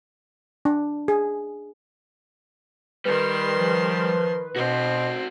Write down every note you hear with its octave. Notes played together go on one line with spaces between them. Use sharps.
D4
G#4
D#3 G3 B4 C6
F3
B2 C4 F#4 C5